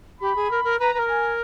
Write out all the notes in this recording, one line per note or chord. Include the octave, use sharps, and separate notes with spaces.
G4 B5
G#4
A#4
A#4
B4 A#5
B4
A#4
G#5